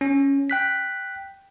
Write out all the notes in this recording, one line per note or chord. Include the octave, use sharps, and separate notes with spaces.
C#4
G5 F#6 B6